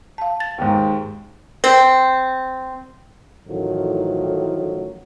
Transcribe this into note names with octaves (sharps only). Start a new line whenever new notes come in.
F5 A5
A6
D#2 G#2
C4
A1 A2 D#3 F3 F#3